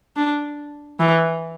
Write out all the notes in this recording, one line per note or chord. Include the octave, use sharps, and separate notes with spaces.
D4
E3